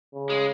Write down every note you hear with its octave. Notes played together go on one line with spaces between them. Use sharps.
C#3
G#3